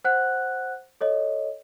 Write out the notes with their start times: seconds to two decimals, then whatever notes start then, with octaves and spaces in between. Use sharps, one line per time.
0.04 C5 F#5 F#6
1.01 A4 C#5 D#5